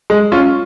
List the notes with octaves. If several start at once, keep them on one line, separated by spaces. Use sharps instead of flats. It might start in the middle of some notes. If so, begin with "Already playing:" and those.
G#3
C#4 F4